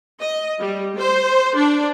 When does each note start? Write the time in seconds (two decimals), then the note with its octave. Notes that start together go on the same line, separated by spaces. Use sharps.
0.20 D#5
0.60 G3
0.97 C5
1.56 D4